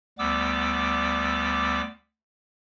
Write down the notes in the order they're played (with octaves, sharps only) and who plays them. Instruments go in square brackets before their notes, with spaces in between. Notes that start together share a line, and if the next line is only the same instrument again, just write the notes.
[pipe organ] D2 G3 B3 D6 E6